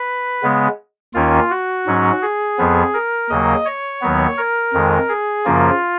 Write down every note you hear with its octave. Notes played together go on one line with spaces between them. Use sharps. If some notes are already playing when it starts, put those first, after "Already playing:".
Already playing: B4
C#3 G#3 B3
D#2 D#3 A#3 C#4 F4
F#4
G#2 F#3 C#4
G#4
F2 F3 B3
A#4
D#2 C#3 F#3 A#3 D#5
C#5
D#2 D#3 F#3 B3
A#4
F2 D#3 G#3
G#4
F#2 C#3 F3 A#3 F4